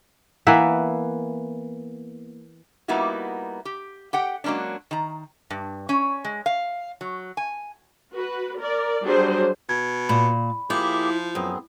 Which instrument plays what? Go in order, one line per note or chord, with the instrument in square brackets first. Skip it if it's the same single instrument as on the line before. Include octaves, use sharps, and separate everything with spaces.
[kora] E3 A#3 B3 E5
[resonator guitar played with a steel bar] G3 A#3 B3 D#4 E4 F#4
G4
G4 F#5 G5
F#3 G#3 A#3 C#4 D4
D#3 A#5
G2
C#4
G#3
F5
F#3
G#5
[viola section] F#4 B4
A#4 D5
F#3 G3 D4 G#4 C5
[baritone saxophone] B2 [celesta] G#6
[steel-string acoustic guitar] A#2 [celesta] B5
[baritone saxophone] F3 [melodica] A#3 G4 G#4 [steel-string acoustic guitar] E4
[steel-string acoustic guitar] F#2 [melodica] B3 C4 G#4